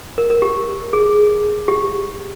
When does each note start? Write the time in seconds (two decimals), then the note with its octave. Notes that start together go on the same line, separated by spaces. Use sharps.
0.18 A#4
0.30 A#4
0.42 G4
0.93 G#4
1.68 G4